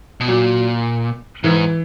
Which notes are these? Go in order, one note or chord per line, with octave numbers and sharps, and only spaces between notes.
B2
A#2 F#3
G#2 E3